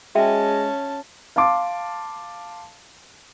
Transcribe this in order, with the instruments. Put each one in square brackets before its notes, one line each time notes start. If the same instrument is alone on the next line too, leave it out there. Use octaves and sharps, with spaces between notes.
[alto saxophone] G#3 [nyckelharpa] C#4 A5 [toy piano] F#4 E5 G5
[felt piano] F5 A5 C6 D6